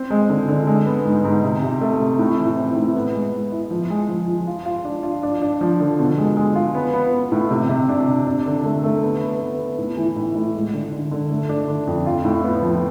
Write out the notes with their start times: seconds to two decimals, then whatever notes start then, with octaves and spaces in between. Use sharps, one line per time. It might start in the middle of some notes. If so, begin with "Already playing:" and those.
Already playing: C4
0.11 G#3
0.29 D3
0.48 D3
0.67 G#3
0.86 B3
1.05 G#2
1.25 G#2
1.44 C3
1.62 C3
1.81 A3
2.00 C3
2.19 A2
2.38 E3
2.57 C4
2.77 A2
2.95 B3
3.14 G#3
3.33 G#3
3.52 E4
3.71 F3
3.90 G#3
4.09 F3
4.28 F3
4.47 F4
4.66 F4
4.85 D4
5.03 F4
5.23 D4
5.42 D4
5.61 F3
5.80 D3
5.99 B2
6.18 G#3
6.37 G#3
6.56 F4
6.75 B3
6.93 B3
7.13 B3
7.32 A2
7.51 C3
7.69 C3
7.89 D4
8.08 C3
8.27 D4
8.46 D3
8.64 A3
8.84 A3
9.03 B3
9.21 B3
9.40 B3
9.59 B3
9.78 A2
9.97 E3
10.16 A2
10.35 A2
10.55 G#3
10.73 D3
10.92 D3
11.11 D3
11.30 A3
11.49 D4
11.68 D3
11.87 F2
12.06 F4
12.25 A2
12.44 B3
12.62 F3